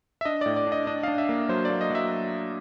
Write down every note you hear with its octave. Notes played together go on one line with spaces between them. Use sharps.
E5
D4 D#5
A2 D5
D5
D4 D#5
D4 D#5
D4 F5
E5
A#3
F#3 C5
A#3 D5
D#5
F#3 E5